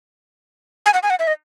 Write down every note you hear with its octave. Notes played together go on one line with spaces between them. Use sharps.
G#5
F#5
G#5
F#5
E5
D#5